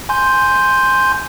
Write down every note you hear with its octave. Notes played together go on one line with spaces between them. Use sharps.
G#5 C6 G6